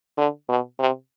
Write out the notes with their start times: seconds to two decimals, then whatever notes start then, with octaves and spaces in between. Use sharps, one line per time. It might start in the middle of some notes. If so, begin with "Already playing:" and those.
0.17 D3
0.49 B2
0.80 C3